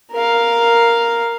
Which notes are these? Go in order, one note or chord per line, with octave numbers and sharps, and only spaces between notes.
A#4 F5